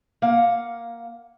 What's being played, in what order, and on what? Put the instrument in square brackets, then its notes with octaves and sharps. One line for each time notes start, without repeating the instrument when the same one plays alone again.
[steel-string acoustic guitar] A#3 F5 F#5